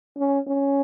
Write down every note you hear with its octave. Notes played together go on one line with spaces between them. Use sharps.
C#4
C#4